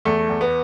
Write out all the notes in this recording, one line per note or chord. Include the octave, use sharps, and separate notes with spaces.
E2 A3
E2
B3